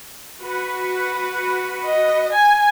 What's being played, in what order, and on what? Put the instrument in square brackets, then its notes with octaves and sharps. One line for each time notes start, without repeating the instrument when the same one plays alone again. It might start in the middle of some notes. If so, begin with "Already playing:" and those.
[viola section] F#4 B4 F#5
[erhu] D#5
G#5